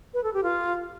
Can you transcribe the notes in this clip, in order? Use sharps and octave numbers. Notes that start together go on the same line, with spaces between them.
B4
A4
G4
F4